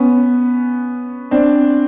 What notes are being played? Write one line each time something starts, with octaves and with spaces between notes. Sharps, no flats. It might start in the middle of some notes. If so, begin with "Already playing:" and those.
Already playing: B3 C#4
C4 D4